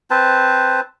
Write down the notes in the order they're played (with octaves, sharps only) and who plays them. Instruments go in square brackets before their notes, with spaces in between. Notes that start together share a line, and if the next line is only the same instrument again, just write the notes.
[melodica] C4 B4 C5 A5